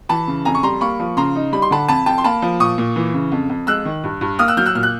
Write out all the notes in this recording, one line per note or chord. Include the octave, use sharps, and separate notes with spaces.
E3 A5 B5
C#3
F2 G#5 A#5
C#6
G3 A#5 C6
A#3 B5 C#6
F3
C#3 A#5 C6
D#4
G3 B5
C6
D3 A5 B5
F2 A5 B5
F2 G5 A5
C6
A#3 A5 B5
F3
A#2 C#6 D#6
A#2
E3
C#3
F2
F2
G#3 E6 F#6
D#3
G2
G2
A#3 D#6 F6
E6 F#6
F#3 F6 G6
E6 F#6
A#2 F6
F#6